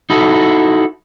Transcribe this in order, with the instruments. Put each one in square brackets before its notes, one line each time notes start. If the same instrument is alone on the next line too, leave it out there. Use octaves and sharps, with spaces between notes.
[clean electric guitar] D#4 E4 F#4 A4